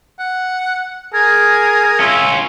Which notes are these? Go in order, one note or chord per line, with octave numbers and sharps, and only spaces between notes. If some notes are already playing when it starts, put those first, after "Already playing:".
F#5
G#4 A#4 G#6
C#4 F4 E5